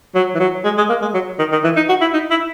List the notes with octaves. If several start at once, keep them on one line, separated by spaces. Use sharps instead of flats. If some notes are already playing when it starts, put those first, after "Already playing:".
F#3
E3
F#3
G#3
G#3
A#3
G#3
F#3
D#3
D#3
E3
D#4
F#4
E4
D#4
E4